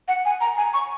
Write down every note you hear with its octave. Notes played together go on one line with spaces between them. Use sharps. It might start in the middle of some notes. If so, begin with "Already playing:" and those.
F#5
G#5
A#5
G#5
C#6